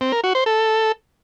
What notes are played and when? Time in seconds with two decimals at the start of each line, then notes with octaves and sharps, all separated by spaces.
0.01 C4
0.12 A#4
0.24 F#4
0.35 C5
0.46 A4